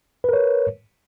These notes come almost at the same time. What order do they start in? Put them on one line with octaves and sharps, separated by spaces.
B4 A#4 C#5